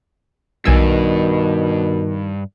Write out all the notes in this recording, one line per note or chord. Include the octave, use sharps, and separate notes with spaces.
B1 G2 B2 D#3 G#5 E6